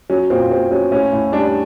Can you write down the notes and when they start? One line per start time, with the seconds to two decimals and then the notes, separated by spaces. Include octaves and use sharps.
0.10 F#3 C#4
0.30 A#2 C4
0.50 A#2 C4
0.71 F#3 C#4
0.92 A2 C#4
1.12 A2
1.32 G3 D4